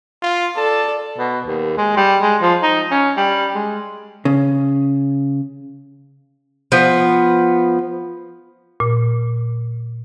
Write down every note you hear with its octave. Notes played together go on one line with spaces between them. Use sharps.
F4
A4 D5 A5
B2
D#2
G#3
G3
G#3
F3
D#4
C#4
G3
G#3
C#3
F3 B3
A#2